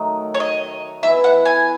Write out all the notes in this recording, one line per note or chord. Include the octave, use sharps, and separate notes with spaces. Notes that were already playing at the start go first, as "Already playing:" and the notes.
Already playing: D#3 F#3 A3 D#4
C#5
D#5
E3 B3 E4 E5
F#5
G#5